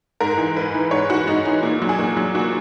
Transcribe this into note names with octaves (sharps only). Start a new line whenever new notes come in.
G#2 A#4
E3
G#2 B4
E3
G#2 C#5
E3 F#4
G#2 D#4
E3 D#4
A#2
F#3
G#4
A#2 F#4
F#3
A#2 F#4